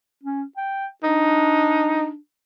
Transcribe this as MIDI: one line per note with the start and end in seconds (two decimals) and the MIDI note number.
0.23 0.44 61
0.57 0.86 79
1.03 2.16 62
1.03 2.08 63